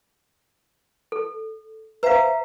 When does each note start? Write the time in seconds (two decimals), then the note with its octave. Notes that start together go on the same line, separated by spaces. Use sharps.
1.12 A4
2.03 B4 C5 E5 F5 A#5